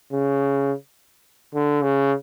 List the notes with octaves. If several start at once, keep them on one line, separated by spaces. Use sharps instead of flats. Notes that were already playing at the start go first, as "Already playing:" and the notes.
C#3
D3
C#3